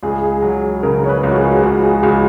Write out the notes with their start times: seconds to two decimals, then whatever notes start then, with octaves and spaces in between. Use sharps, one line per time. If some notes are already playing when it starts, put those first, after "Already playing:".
0.03 C#2 G#4
0.42 F#3
0.83 C#3 A#4
1.04 C#5
1.09 B4
1.23 C#2
1.31 F#4
1.36 G#4
1.63 C#2 F#4
1.84 G#4
2.03 C#2 F#4